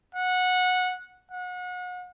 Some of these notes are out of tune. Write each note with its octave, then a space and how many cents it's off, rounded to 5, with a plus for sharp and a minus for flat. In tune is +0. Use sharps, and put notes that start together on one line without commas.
F#5 -15
F#5 -35